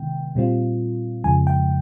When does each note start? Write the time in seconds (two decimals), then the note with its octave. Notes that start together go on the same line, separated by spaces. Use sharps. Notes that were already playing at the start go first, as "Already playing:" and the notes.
Already playing: C3 D#3 G#3 B3 G5
0.35 A#2 G3 C4 F4
1.24 F2 C#3 F3 G#3 G#5
1.47 G5